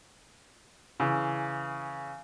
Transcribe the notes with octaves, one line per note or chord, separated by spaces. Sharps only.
C#3 E3